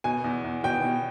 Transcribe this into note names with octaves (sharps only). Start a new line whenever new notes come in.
B2 G#5
E2
E2
B2 G5
B2